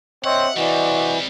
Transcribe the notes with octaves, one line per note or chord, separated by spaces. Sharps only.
C4 C#5 D#5 E5 F#5
E3 G3 C4 F#4 D5 D#5